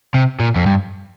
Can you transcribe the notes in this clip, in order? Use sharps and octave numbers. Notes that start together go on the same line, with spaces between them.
C3
A#2
F2
G2